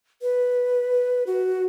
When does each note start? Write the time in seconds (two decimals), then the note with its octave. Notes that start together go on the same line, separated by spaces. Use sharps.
0.22 B4
1.27 F#4